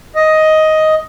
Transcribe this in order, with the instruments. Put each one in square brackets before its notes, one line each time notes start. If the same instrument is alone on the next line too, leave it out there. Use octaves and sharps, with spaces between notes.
[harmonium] D#5